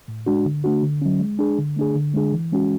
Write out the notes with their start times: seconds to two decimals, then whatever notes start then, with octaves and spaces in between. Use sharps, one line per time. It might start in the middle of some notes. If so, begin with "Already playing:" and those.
0.08 A2
0.26 G#3 D4 F#4
0.45 D3
0.64 A3 D4 F#4
0.83 D3
1.02 F#3 C#4
1.20 G#3
1.39 D4 G#4
1.58 D3
1.76 A3 D4 G#4
1.95 D3
2.14 G#3 D4 G#4
2.33 E3
2.52 G#3 C#4 F#4